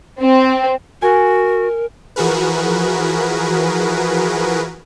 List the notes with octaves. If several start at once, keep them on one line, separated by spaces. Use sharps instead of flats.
C4
F#4 A#4 G#5
E3 F3 F#4 G#4 A#4 B4